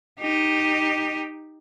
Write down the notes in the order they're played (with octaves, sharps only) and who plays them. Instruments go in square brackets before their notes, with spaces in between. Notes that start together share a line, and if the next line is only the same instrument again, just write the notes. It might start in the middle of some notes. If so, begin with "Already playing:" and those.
[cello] D#4 G4